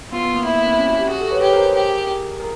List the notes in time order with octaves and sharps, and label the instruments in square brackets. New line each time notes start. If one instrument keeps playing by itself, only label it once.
[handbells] B3 [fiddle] F4
[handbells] B3
A#3
[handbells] B3 [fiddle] E4
[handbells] A#3
C4
C#4
F#4
G4
[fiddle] F#4 [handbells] G#4
[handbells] G4 A4
B4 C#5
[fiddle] G4 [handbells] B4 C#5
[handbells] A#4 C5
G#4 A#4
[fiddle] G4
[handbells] G#4 A#4